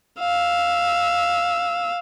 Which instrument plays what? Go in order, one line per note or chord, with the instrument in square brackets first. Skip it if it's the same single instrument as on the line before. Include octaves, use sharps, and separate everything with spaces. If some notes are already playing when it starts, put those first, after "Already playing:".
[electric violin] F5 E6